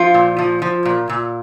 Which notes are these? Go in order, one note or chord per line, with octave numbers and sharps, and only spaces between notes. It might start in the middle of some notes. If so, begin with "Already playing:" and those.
Already playing: F3 F4
A#2
F3
F3
A#2
A#2